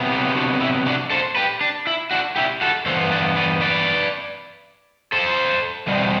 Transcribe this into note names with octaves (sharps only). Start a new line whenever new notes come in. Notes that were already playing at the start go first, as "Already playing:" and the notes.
Already playing: C3 F#3 B3
E4 G4
G4
D4 F#4
E4
D4 F#4
A4 C5
G4 B4
D4
E4
D4 F#4
E4 G4
F#4 A4
G2 E3 B3 A4 C5
B4 D5
B4 D5
B4 D5
A4 C5
E2 B2 G3 C4